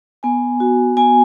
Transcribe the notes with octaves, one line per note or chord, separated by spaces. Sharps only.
B3 G#5
F#4
B3 G#5